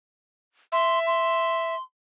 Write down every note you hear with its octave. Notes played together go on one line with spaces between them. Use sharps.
E5 C6
C6